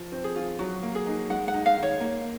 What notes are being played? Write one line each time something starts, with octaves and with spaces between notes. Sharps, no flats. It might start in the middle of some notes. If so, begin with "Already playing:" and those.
Already playing: F3
C4
G#4
F4
F#3 F#4
A#3
G#4
D#4
G#3 F#5
F#5
D#4
F5
D#3
C#5
A#3